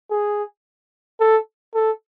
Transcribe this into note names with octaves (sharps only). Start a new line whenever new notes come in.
G#4
A4
A4